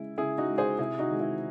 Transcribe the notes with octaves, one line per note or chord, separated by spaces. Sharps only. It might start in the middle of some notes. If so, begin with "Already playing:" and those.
Already playing: C#3 G#3 E4
C#3 E4 G#4
D#4 F#4
G#3
G#4 C5
C3 E4 G#4
D#4 F#4
D#3 G#3
E4